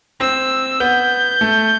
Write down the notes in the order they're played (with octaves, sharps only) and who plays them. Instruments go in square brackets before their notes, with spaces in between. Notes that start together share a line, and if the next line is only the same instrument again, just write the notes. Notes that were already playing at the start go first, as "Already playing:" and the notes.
[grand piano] C4 [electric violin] E6
[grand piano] B3 [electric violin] G6
[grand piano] A3